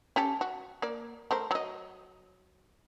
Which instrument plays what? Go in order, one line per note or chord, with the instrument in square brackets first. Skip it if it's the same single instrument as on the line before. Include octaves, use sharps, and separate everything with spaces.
[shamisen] C#4 G4 A4
F#4
A#3 D5
A3 A#4 C5
F#3 D#5